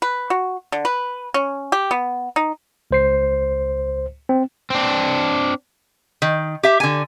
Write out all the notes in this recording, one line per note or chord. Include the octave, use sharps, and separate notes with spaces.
B4
F#4
D3
B4
C#4
G4
B3
D#4
C#2 C5 C7
C4
C4 D4
D#3
G4 E5
D3 G#5